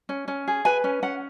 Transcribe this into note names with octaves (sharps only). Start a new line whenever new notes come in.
C#4
C#4
G#4
B4 G#5
C#4
C#4 F#5